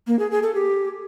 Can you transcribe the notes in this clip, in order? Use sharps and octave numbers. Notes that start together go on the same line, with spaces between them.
A#3
G#4
G#4
A4
G4